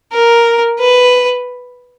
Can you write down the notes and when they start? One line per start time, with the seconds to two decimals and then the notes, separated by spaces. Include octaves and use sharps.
0.12 A#4
0.80 B4